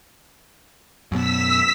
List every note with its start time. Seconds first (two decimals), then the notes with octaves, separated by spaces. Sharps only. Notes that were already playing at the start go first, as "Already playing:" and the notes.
1.12 F#2 B2 E6 B6